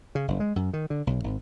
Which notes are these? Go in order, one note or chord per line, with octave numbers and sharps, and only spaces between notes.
C#3
F#1
G#3
F#2
D#3
D3
B1
G#1